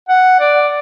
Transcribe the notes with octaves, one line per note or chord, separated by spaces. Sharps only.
F#5
D5